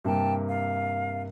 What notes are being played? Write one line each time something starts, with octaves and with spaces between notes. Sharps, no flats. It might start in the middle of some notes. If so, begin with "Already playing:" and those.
G2 C3 A#3 G5 A5
F5